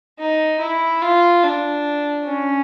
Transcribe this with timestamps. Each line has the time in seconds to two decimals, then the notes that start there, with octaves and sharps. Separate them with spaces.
0.19 D#4
0.60 E4
1.02 F4
1.43 D4
2.25 C#4